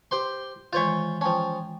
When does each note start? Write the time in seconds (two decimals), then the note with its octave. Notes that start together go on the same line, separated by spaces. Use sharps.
0.11 G4 C5 C6
0.73 D#3 E3 G#3 F4 C5 C#5
1.21 F3 C#4 G5 A5